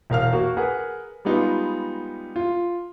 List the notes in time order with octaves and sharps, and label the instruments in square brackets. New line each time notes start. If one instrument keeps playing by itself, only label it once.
[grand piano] E1 A#4 F5 F6
A#3 F#4
G#4 A#4 B4 F#5
G3 G#3 B3 D#4 F4
F4